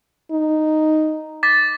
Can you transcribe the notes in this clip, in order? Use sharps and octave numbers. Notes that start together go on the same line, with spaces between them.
D#4
D6 A6 B6